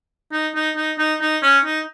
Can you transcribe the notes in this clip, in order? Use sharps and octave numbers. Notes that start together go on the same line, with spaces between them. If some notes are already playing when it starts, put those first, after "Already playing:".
D#4
D#4
D#4
D#4
D#4
C#4
D#4